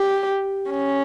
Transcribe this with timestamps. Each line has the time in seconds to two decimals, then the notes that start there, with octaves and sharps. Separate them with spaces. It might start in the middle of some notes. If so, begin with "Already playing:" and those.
Already playing: G4
0.71 C#4